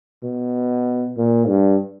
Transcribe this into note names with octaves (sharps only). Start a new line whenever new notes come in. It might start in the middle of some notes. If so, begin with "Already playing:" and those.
B2
A#2
G2